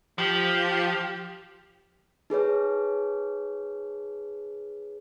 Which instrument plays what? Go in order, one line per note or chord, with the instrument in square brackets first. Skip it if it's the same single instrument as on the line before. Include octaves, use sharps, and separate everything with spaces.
[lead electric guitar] F3 [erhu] G4
[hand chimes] D#4 G#4 B4 C#5